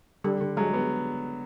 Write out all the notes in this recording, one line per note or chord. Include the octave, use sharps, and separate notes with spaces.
D3 G3
D3
F#3 G#3
B3